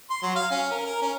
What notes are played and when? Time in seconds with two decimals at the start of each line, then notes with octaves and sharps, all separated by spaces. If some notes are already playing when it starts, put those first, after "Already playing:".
0.10 C6
0.23 F#3
0.36 F5
0.51 C#4
0.71 A#4
0.86 A#4
1.02 C#4